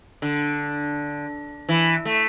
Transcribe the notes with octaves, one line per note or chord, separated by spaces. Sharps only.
D3
E3
A3